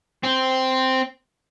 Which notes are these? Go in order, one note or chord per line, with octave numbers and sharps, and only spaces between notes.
C4